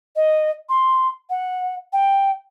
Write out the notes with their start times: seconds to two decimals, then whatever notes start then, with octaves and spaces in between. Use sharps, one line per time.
0.16 D#5
0.69 C6
1.30 F#5
1.93 G5